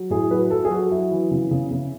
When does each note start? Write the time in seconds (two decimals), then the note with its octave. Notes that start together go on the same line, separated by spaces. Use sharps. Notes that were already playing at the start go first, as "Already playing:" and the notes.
Already playing: F#3
0.10 A2 G#4
0.31 F#3 B4
0.51 F#3 A4
0.65 G#4
0.70 F#3 F#4
0.91 F#3 E4
1.11 E3
1.31 C#3
1.51 C#3
1.71 C#3